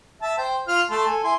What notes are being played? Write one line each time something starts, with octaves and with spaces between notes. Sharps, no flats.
E5 A5
C5 G5
F4 F6
A3 A5 C6
A4 G#5
E4 G#5 C6